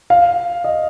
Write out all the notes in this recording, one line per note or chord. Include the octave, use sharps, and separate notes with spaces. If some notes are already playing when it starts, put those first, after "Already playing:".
F5
D#5